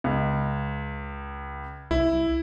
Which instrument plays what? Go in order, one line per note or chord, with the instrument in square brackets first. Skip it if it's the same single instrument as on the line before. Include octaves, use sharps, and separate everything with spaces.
[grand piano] C#2
[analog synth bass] C2 [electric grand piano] E4